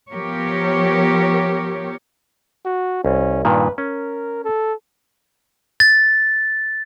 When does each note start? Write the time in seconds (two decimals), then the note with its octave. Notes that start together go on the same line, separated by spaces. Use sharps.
0.13 F3 B3 G4 A#4 C#5
2.66 F#4
3.05 C2 C#4
3.45 G2 A#2 D#3 B4
3.78 C#4 A#4
4.44 A4
5.80 A6